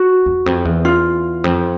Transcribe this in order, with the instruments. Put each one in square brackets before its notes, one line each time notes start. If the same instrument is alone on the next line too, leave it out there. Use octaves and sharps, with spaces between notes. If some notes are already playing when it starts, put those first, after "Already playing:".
Already playing: [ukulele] F#4
[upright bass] E2
F2
E2
[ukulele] F4
[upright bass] F2